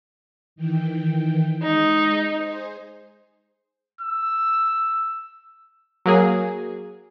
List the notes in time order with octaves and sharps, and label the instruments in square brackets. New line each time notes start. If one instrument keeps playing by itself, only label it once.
[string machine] D#3 E3 G5
[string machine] G#3 [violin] D#4
[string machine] G#4 C5
[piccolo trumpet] E6
[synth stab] F#3 A#3 G#4